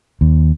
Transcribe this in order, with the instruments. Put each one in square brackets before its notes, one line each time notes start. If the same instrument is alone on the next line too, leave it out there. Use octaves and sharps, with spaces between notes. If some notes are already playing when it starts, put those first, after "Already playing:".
[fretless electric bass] D#2